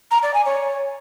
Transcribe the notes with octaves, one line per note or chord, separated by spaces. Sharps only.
A#5
D5
G#5
C#5